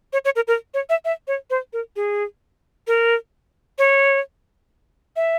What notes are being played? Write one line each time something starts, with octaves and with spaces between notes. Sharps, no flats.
C#5
C#5
A#4
A#4
C#5
E5
E5
C#5
C5
A#4
G#4
A#4
C#5
E5